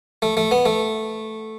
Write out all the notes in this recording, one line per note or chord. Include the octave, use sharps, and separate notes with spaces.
A3
A3
B3
A3